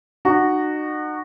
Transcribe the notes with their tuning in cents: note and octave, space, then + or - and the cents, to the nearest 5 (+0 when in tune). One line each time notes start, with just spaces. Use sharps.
D#4 -40 F#4 +0